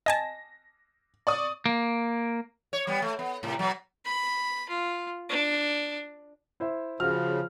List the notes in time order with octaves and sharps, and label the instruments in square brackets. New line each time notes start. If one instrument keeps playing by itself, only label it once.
[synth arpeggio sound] D#5 G#5 A5 [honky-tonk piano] A#6
[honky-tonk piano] D5 C#6 D#6
[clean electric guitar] A#3
[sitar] C#5
G3 B3
A3
B3
A2 C3
B2 F#3
[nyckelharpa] B5
F4
D4
[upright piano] E4 C5 E5
[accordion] C#3 [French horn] F3 [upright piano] F#4 [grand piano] F6